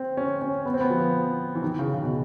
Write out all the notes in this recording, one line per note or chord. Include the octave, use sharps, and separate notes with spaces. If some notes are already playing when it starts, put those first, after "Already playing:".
Already playing: C4
C#4
C#4
B3
C4
B3
F3
E3
D#3
C#3
C#3
B2